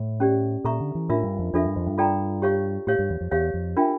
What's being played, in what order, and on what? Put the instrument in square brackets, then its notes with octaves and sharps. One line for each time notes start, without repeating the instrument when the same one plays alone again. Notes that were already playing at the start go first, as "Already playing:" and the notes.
Already playing: [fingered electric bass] A2
[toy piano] C#4 G4 D5
[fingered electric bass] A#2 [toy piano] A4 E5 A#5 C#6
[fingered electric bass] D3
E3
[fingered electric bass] A2 [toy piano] D4 F4 A#4 E5
[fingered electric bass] G2
F2
[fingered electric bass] F2 [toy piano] D4 F4 A4 E5
[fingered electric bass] G2
F2
G2
[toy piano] F4 A4 D5 G5 A#5
G4 C#5 F5 C#6
[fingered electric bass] A2 [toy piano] G4 C#5 F5
[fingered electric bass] G2
E2
F2
[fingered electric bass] E2 [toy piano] G4 C#5 F5
[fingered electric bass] F2
[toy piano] D4 F4 A#4 E5 G5